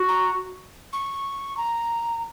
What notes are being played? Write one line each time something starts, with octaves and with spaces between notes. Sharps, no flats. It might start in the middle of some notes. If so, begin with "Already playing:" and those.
Already playing: F#4
A#5
C#6
A#5